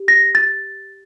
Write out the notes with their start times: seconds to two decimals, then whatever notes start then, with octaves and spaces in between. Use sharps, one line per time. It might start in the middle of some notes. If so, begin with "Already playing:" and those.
Already playing: G4
0.08 A#6
0.35 A6